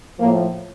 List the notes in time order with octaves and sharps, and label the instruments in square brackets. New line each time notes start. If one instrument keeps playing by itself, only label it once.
[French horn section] A2 F3 A#3